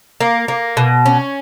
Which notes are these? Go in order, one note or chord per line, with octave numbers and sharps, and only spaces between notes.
A#3
A#3
B2
C#4